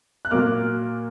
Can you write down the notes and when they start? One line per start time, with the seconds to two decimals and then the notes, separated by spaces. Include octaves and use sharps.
0.25 F#6
0.31 A#2 F#3 A#3 D6 F6